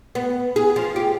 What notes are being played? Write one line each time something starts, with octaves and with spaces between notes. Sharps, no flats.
B3
G#4
F3
G4